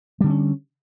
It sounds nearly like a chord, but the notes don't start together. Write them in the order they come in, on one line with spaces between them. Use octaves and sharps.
G3 D3 C4 C#4